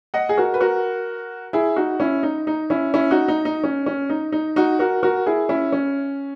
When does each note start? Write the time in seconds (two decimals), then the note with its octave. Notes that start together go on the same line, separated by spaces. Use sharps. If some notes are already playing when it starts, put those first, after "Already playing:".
0.14 D#5 F#5
0.29 G#4
0.37 F#4 A#4
0.54 B4
0.60 F#4 A#4
1.53 E4 G#4
1.76 D#4 F#4
2.00 C#4 E4
2.23 D#4
2.47 D#4
2.70 C#4 E4
2.94 C#4 E4
3.11 D#4 F#4
3.28 D#4
3.45 D#4
3.64 C#4
3.86 C#4
4.10 D#4
4.32 D#4
4.56 D#4 F#4
4.79 F#4 A#4
5.03 F#4 A#4
5.26 E4 G#4
5.49 C#4 E4
5.72 C#4